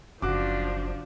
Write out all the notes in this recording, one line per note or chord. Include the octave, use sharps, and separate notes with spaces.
F#1 F3 D4 F#4 D6